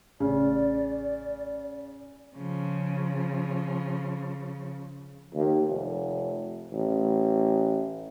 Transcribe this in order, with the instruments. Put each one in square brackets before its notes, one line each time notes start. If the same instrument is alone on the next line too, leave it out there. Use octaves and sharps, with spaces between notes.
[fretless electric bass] A1 [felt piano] C#3 [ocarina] D5
[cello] C#3 F3
[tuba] D#2
F1
A1